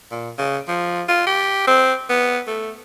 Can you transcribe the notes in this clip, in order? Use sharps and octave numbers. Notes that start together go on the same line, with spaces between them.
A#2
C#3
F3
F4
G4
C4
B3
A3